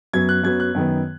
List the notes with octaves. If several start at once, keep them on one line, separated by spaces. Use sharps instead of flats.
F#2 F#3 B3 G#6
F#6
F#2 F#3 B3 G#6
F#6
F#2 D#3 B3